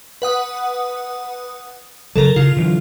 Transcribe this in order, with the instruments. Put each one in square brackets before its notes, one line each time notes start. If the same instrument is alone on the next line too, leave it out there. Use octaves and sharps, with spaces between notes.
[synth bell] B4 F#5 D#6
[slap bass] C#3 F#3 [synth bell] A4 A#4
[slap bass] C#3 [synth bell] F4
[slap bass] D3 E3 F#3